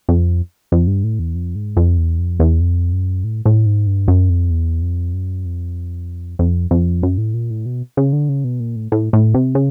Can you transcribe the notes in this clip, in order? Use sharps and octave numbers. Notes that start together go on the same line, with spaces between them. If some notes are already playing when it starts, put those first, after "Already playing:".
F2
F2
G2
A2
E2
F2
G#2
F2
E2
F2
E2
F2
F#2
A2
A2
G#2
G2
F#2
F2
E2
F2
F#2
F2
F2
F2
F#2
A2
A#2
A2
B2
C#3
D3
C#3
B2
A#2
A2
A2
A2
C3
C#3